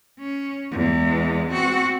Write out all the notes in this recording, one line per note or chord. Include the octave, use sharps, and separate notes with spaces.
C#4
E2 G#3
C4 F#4